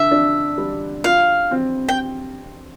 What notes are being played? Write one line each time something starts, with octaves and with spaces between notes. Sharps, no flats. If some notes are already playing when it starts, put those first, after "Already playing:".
Already playing: D3 E5
D4
G3
F4 F5
C4
G5